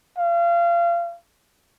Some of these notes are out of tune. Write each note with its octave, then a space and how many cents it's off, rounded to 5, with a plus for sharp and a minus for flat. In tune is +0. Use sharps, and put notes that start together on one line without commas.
F5 -30